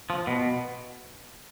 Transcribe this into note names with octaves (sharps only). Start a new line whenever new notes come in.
F3
B2